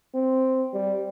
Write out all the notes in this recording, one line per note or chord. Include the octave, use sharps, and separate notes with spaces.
C4
G3